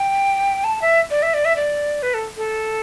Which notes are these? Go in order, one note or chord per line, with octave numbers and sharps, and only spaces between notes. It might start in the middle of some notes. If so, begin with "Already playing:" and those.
Already playing: G5
A5
E5
D5
E5
D5
E5
D5
B4
A4
A4